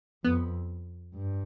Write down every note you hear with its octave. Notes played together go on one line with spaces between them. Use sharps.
F2 B3
G2